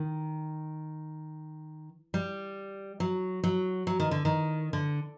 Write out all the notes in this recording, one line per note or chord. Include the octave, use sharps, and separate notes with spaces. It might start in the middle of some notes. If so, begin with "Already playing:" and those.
Already playing: D#3
G3
F#3
F#3
F#3
D#3
D3
D#3
D3